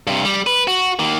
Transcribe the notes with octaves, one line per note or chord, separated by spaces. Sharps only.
G2 C3
G3
B4
F#4
D#3 A#3